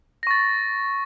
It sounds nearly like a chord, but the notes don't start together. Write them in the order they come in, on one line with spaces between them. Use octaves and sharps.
A#6 C#6 A6